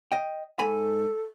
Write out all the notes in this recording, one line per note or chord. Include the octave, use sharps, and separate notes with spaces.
D#5 G5
G#2 A4 G#5 B5